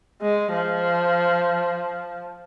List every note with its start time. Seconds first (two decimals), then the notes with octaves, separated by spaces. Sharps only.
0.22 G#3
0.54 F3